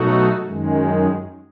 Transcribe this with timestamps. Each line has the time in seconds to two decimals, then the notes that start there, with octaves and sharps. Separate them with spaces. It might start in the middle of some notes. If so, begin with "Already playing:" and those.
Already playing: B2 F#3 A3 D#4 F#4
0.44 F#2 D#3 G#3